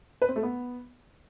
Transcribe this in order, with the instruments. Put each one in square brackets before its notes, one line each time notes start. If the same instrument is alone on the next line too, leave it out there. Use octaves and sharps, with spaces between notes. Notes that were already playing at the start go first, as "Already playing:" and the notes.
[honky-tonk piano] B4
C4
A3
B3